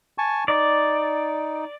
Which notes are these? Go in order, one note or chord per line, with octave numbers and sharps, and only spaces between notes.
G#5 A5 C#6
D#4 D5